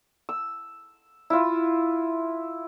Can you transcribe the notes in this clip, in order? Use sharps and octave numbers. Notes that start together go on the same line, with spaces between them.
E6
E4 F4